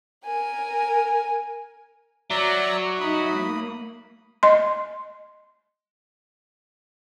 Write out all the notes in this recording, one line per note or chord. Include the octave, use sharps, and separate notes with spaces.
A#4 G#5
F#3 D5 E5 A#5
D#4 E5 B5 D#6
A#3
D#5 C6